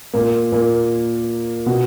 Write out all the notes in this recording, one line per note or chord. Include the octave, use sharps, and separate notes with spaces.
A#2 A#3
A#2 A#3
B2 B3